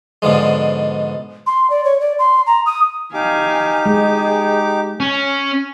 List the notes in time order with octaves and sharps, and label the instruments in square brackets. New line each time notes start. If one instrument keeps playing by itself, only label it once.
[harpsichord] G#2 B2 D3 F3 G#3
[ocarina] C6
D5
C#5
D5
C6
A#5
D#6
[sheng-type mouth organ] D#4 G4 D6 [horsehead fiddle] F5 G#5
[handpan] G#3 [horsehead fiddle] G#4
[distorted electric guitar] C#4